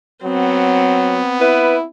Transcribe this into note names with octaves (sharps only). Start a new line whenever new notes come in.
F#3 B3 C4
E4 B4